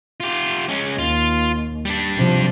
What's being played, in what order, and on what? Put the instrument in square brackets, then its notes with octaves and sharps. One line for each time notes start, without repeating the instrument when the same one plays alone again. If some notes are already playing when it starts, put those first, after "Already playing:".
[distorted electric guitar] F4 G4
G#3 C#4
[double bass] D#2 [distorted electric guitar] F4
[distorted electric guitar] G3 D4
[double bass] C3 F3